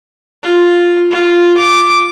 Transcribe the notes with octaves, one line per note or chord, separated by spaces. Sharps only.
F4
F4
D6